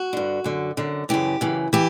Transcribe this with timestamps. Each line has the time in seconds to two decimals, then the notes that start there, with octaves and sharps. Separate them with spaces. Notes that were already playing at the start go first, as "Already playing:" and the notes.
Already playing: F#4
0.13 G2 D3
0.44 F#2 D3
0.77 F#2 D3
1.09 F#2 C#3 E3 G4
1.41 F#2 C#3 E3
1.73 E3 G4